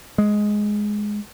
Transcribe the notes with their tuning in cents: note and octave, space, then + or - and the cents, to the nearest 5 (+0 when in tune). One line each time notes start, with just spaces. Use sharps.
G#3 +5